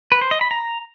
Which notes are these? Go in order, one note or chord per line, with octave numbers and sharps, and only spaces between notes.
B4
C5
D#5
B5
A#5